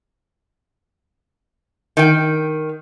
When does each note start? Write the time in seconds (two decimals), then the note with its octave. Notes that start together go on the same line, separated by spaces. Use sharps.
1.97 D#3 G5